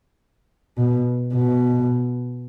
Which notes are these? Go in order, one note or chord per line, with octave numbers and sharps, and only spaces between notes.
B2
B2